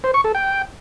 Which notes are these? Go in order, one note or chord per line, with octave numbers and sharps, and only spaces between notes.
C5
C#6
A4
G5